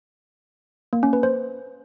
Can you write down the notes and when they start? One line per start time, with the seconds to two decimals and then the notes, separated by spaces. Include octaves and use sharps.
0.93 A#3
1.03 C#4
1.13 B4
1.23 C5